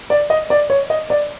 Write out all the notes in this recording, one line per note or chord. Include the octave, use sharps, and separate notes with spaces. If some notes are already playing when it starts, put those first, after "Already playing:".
D5
D#5
D5
C#5
D#5
D5